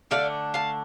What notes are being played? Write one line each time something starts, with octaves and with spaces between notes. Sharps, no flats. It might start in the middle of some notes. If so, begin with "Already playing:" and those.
D3 A3 D4 D5 F5
F5 A5